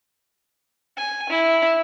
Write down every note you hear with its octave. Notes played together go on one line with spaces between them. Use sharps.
G#5
E4